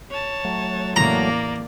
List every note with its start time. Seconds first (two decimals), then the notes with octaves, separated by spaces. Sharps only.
0.11 C#5 A5
0.45 F#3 A3
0.96 A1 E2 A#3 D5 A#5